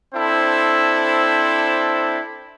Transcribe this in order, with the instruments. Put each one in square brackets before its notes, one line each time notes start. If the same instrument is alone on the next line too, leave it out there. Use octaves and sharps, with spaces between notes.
[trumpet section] C4 D4 E4 A4 C5